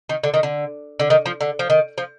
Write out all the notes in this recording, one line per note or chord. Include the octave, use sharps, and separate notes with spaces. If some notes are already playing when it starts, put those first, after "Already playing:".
D#3
D3
D#3
D3
D3
D#3
F3
D3
F3
D#3
F3